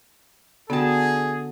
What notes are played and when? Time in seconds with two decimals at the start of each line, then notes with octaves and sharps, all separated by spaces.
0.70 D3 B3 F#4 G#4 G5 A5